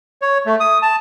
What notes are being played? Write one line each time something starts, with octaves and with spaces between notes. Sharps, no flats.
C#5
A3
D#6
A5